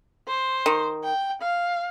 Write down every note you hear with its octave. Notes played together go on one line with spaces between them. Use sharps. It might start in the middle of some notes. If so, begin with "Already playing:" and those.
C5
D#3
G5
F5